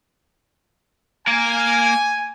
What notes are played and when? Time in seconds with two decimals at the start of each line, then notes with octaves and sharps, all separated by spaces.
1.27 A#3 A#4 G#5